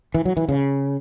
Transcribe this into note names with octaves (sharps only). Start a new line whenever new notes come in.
E3
F#3
E3
C#3